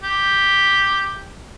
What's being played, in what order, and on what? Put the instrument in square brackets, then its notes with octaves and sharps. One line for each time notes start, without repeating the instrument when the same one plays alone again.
[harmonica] G4